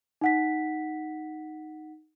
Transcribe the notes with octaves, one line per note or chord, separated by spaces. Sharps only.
D#4 F#5 B6